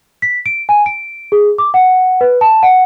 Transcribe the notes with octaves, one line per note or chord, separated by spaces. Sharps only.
B6
D7
G#5
D7
G#4
D6
F#5
B4
A5
F#5